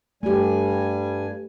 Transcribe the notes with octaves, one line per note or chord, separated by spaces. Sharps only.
G2 G3 A3 G4 G#5